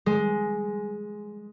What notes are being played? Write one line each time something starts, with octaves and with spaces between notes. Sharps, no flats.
G#3